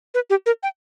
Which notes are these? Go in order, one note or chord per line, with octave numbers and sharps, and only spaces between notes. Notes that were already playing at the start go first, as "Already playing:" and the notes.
B4
G4
A#4
G5